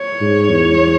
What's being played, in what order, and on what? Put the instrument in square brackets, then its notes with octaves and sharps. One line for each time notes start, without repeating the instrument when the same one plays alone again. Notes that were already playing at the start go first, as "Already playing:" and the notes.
Already playing: [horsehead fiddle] C#5
[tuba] G#2
E2